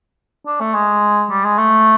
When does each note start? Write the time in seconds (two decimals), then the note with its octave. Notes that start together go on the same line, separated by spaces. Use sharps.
0.47 D4
0.60 A3
0.74 G#3
1.30 G3
1.45 G#3
1.58 A3